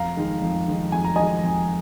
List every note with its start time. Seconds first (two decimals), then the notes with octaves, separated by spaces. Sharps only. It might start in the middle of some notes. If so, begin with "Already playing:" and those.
Already playing: F2 F5 A#5
0.17 D#3 G#3 D#4
0.42 F2
0.68 D#3 G#3 D#4
0.92 F2 G#5
1.04 A#5
1.16 D#3 G#3 D#4 D#5 G#5
1.43 F2